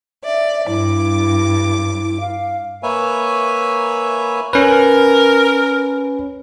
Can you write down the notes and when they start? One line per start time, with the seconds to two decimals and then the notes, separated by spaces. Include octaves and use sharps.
0.25 D5 E5
0.67 G2 E4 D6
2.20 F5
2.83 A#3 B4 C#5 E5 G#5
4.53 C#4 A#4 B4